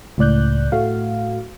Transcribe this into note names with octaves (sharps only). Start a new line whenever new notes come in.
C#2 A2 D5 F#6 G6
A2 A3 F#4 F5